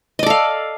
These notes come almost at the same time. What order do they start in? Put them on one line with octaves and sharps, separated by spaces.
D#5 D5 A4 F5